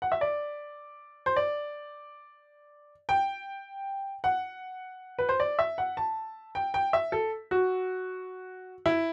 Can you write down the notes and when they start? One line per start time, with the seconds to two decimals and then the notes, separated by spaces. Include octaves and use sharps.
0.02 F#5
0.12 E5
0.21 D5
1.26 C5
1.36 D5
3.09 G5
4.24 F#5
5.19 B4
5.29 C5
5.40 D5
5.59 E5
5.78 F#5
5.97 A5
6.55 G5
6.74 G5
6.93 E5
7.12 A4
7.51 F#4
8.86 E4